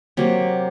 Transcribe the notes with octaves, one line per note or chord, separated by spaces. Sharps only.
C3 F#3 A#3